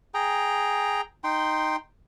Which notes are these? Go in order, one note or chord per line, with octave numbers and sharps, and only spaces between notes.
G#4 G5 A#5
D#4 G5 C6